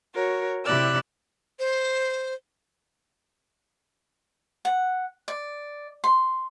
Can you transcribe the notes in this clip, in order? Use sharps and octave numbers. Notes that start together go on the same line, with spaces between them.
F#4 A#4 C#5
C3 E4 G4 D5 E6 F#6
C5
F#5
D5
C6